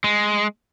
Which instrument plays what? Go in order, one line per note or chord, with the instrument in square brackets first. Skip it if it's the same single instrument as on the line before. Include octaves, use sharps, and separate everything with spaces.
[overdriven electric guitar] G#3